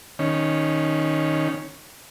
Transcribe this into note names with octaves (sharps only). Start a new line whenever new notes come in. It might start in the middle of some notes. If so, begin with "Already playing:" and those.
D#3 C#4